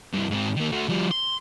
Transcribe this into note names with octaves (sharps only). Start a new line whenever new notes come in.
G2 E3
G#2 C4
D#3 A#3
A3 F#4
F3 G3
C6